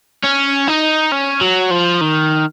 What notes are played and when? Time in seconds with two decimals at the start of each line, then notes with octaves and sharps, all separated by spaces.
0.24 C#4
0.68 D#4
1.12 C#4
1.41 F#3
1.71 F3
2.01 D#3